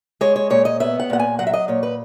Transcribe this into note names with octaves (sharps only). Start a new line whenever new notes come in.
G#3 C#5
C#5
A#2 C#5
D#5
B3 E5
F#5
A#2 F#5
G#5
F#3 F#5
E5
D#5
A#2 C#5
B4